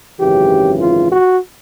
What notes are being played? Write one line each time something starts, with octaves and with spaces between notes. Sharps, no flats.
G#1 F#2 C#3 E3 G4
F4
F#4